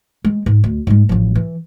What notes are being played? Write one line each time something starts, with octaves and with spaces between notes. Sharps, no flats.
G#3
G#2
D2
G#2 G#3
A1 F3
E3